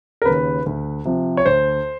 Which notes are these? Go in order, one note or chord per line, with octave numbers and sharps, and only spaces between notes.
A#4
D#2 C#3 B4
D2
C3 F3
C#5
D2 C5